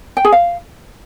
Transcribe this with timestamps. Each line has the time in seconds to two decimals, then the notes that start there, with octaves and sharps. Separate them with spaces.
0.17 G5
0.25 G#4
0.32 F5